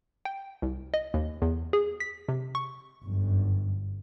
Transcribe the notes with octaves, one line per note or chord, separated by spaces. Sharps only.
G5
C2
D#5
D#2
E2
G#4
B6
C3
C#6
G1 F#2